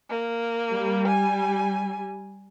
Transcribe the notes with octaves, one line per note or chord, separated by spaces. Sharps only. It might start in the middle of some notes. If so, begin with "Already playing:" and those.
A#3
G3
G#5